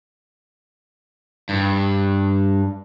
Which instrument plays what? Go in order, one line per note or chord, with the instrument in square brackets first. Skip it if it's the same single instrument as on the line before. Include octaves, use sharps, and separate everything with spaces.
[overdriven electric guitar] G2